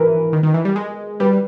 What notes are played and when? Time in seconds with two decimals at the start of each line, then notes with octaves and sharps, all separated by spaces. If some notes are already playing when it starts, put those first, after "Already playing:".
Already playing: E3 A#4 B4
0.33 D#3
0.43 D#3
0.54 E3
0.65 G3
0.76 G#3
1.20 G3 B4